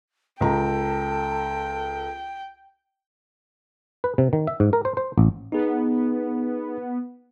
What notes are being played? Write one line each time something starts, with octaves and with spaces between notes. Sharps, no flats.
C#2 A4 G5 A#5
B4
C3
D#3
E5
G#2
A#4
C5
C5
A1
B3 D#4 G#4